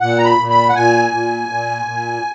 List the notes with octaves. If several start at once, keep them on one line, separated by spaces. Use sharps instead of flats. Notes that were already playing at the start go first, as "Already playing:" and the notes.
A#2 F#5
A#5
B5
A#2
B5
F#5
A#2 G#5
A#2
A#2
A#2